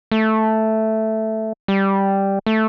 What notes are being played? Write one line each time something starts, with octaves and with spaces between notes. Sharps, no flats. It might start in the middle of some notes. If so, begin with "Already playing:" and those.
A3
G3
A3